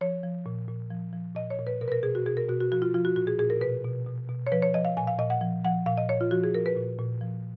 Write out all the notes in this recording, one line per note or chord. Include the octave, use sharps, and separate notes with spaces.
F3 C#5
F3
A#2
A#2
F3
F3
A#2 D#5
C#5
A#2
B4
B2 A#4
B4
A#4
B2 G#4
F#4
B2 G#4
A#4
B2 F#4
F#4
F3 F#4
F4
F3 F4
F#4
A#2 F#4
G#4
A#2 G#4
A#4
B2 B4
B2
B2
B2
C#5
F3 B4
C#5
F3 D#5
F5
A#2 G#5
F5
A#2 D#5
F#5
F3
F3 F#5
A#2 F5
D#5
A#2 C#5
F4
F3 F#4
G#4
F3 A#4
B4
A#2
A#2
F3